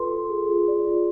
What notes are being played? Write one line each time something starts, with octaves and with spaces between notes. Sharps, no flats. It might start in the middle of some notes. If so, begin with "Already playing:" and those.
Already playing: F4 A4 B4 C6
F4
G#4
F4
D5
F4